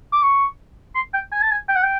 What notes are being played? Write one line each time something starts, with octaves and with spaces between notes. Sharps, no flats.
D6
C#6
C6
G5
G#5
A5
G#5
G5
F#5
G5